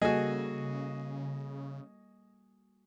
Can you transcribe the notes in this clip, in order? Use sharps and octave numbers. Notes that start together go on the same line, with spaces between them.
C#3 G3 A#3 F#4 G#4 A4 D#5